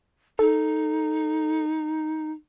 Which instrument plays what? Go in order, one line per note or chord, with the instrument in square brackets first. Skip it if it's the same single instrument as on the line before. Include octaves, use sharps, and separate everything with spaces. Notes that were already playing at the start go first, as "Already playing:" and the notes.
[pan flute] D#4 [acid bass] A4